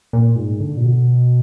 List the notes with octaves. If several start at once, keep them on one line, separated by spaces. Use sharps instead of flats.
A#2
G#2
D3
A#2
B2